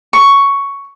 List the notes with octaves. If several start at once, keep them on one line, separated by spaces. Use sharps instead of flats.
C#6